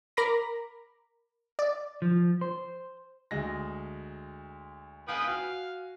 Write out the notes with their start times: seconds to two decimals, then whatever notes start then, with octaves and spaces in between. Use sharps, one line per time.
0.17 A#4 A#5 B5 D6 A#6
1.59 D5
2.02 F3
2.41 C5
3.31 D2 G#3 A#6
5.08 B4 F5 G5 G#5 D#6
5.28 F#4 F5 G#5